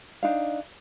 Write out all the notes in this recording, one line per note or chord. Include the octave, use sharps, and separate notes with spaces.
D4 D#4 F5